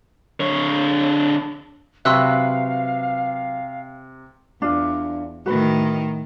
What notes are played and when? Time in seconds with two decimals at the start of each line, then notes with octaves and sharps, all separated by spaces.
0.40 D3 C#5
2.05 C3 F#3 B4 E5 F5 C6 E6 F#6
4.62 E2 D4 F4
5.46 A2 D#3 F#4 B4